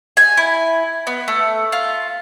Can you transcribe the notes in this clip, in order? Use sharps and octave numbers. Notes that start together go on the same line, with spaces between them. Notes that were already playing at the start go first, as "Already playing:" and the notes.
G#5
E4
B3
A3
F4